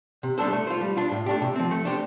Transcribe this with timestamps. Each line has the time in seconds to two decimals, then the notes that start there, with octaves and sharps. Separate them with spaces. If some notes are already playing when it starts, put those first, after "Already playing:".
0.23 C3
0.38 G3 D4 A4 C5
0.53 A3
0.67 F4 C5
0.81 G3
0.97 D4 F4
1.12 A2
1.26 A3 D4 G4
1.42 C3
1.56 F3 C4
1.71 A3
1.85 D4 G4 C5